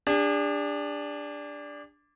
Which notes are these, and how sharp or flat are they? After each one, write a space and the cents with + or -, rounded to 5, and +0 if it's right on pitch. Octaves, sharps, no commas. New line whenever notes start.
D4 -5 G#4 -45